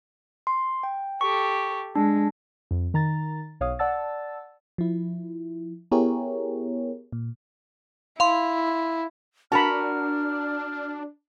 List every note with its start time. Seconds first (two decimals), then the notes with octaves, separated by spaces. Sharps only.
0.47 C6
0.83 G5
1.21 G4 A4 C#6
1.95 G#3 D4
2.71 F2
2.94 D#3 A#5 A6
3.60 B1 C#5 F5 D#6
3.79 D5 F#5 A5 E6 A6
4.78 F3 E4
5.92 B3 E4 G4 G#4 A#4 C#5
7.13 A#2
8.20 E4 F5 C6
9.52 D4 F#4 A#4 A5 B5 F6